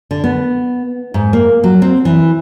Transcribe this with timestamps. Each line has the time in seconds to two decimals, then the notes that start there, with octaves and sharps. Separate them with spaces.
0.11 D3
0.24 B3
1.14 G#2
1.33 A#3
1.64 F#3
1.82 C4
2.05 E3